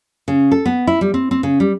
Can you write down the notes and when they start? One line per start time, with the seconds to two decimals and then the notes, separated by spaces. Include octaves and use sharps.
0.28 C#3
0.52 A4
0.66 B3
0.87 E4
1.01 G3
1.14 C4
1.31 C4
1.43 C#3
1.60 G3